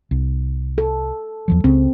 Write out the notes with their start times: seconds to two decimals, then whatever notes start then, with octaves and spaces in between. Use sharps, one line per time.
0.11 C2
0.78 A4
1.48 E2 F3 F#3
1.64 C#2 C#3 C4